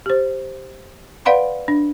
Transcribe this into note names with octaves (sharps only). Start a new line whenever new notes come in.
G4 C5
B4 D5 F5 F#5 B5 C6
D4